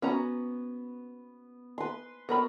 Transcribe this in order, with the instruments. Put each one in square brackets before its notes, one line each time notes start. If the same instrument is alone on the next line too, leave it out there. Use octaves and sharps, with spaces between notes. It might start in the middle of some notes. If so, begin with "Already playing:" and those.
[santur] B3 [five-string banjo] C#4 F#4 A#5
[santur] B4 C6
[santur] B3 [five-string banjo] F#4 A#4 B5